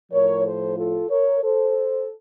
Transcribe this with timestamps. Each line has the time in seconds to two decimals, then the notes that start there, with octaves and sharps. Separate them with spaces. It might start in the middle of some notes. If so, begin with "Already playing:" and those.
0.11 A2 F3 A#4 C#5
0.44 A4 C5
0.77 F4 A4
1.09 A#4 C#5
1.42 A4 C5